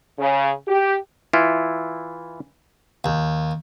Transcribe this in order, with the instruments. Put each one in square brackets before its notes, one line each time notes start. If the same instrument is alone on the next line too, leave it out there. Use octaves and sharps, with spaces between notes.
[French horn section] C#3
G4
[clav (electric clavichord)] E3 E4 F4
[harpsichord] D#2